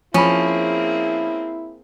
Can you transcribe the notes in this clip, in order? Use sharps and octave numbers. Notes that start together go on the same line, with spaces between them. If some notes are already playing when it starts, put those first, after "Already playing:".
F3 A#3 C4 C#4 E4 G#4 B5